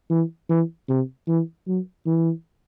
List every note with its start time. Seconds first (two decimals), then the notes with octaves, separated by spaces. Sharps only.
0.10 E3
0.49 E3
0.88 C3
1.28 E3
1.67 F#3
2.06 E3